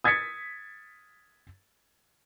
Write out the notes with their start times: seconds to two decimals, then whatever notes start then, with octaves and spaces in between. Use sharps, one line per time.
0.04 D#6 G#6 A6 B6 C#7